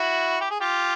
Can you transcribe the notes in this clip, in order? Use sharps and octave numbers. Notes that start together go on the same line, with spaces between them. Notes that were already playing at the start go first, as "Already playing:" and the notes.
Already playing: E4 F#4
G4
G#4
F4 G4